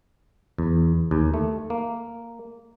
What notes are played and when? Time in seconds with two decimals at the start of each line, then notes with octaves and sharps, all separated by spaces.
0.58 E2
1.11 D#2
1.34 A3
1.70 A#3